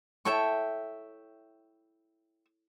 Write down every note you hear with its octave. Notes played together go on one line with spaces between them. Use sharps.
E4 A4 C#5 E5 G5 C#6